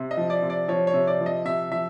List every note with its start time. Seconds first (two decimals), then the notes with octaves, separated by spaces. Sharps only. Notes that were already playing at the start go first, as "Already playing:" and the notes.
Already playing: C3
0.11 D#5
0.17 F3
0.30 D5
0.42 C3
0.50 D5
0.68 F3 C#5
0.87 C#5
0.94 C3
1.07 D5
1.21 F3
1.26 D#5
1.45 C3 E5
1.71 F3 E5